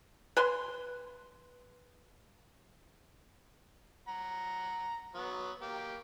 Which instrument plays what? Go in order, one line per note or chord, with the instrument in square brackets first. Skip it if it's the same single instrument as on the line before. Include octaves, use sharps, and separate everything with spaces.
[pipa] B4 G#5 C6
[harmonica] F#5 A#5
F#3 B3
A#3 G4